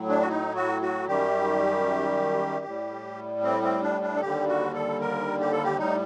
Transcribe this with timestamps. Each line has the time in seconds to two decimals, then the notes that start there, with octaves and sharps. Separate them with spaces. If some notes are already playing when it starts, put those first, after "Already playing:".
Already playing: A2 F#3
0.09 D4
0.21 F#4
0.29 D#4
0.55 F#4
0.82 F#4
1.08 F#2 D#3 G3 G4
2.65 A2 G3
3.44 C4
3.63 C4
3.82 D4
4.02 D4
4.16 A4
4.21 D#2 D3 G3 G4
4.48 F#4
4.74 A4
5.01 A#4
5.40 G4
5.51 A4
5.63 G4
5.78 A2 G3 D#4